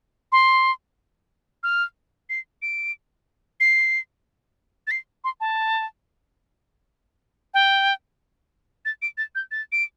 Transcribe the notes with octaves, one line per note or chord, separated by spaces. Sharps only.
C6
F6
C7
D7
C7
A6
C7
C6
A5
G5
A6
D7
A6
G6
A6
D7